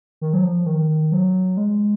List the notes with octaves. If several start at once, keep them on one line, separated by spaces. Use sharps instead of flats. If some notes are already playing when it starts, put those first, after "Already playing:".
D#3
F#3
F3
D#3
D#3
F#3
G#3